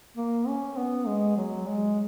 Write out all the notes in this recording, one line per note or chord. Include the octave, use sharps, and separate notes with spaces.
A#3
C#4
B3
G#3
F#3
G#3